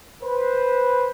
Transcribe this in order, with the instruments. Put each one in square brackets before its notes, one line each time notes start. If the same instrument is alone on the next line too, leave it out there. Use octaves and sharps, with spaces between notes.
[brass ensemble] B4 C5